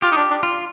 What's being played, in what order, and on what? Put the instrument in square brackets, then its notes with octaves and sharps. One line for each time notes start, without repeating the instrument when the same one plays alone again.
[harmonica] F4 [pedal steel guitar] G4
[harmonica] D#4
D4
D4
[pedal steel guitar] F4